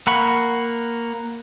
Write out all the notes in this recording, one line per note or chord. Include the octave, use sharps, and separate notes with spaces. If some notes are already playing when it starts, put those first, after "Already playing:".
A#3 F#5 B5 C#6